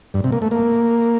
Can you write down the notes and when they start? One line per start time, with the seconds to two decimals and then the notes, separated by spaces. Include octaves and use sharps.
0.14 G2
0.24 C3
0.32 A#3
0.42 A3
0.51 A#3